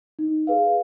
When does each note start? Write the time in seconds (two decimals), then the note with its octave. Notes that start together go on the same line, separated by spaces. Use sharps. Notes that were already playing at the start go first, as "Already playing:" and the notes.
0.19 D#4
0.47 G#4 B4 F5